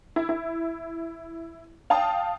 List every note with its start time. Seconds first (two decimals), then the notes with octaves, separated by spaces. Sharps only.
0.16 E4
0.29 E4
1.90 F5 G5 A5 D#6